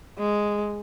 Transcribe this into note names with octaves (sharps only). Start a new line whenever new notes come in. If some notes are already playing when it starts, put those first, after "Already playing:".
G#3